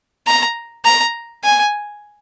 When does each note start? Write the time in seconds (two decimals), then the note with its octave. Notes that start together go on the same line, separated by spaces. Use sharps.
0.27 A#5
0.85 A#5
1.44 G#5